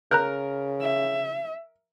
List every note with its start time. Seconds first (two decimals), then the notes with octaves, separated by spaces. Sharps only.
0.11 C#3 A#4 A#5 F#6 G6
0.82 E5